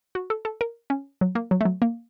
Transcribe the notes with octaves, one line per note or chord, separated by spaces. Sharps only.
F#4
A4
A4
A#4
C#4
F#3
A#3
F#3
A3
F#3
A#3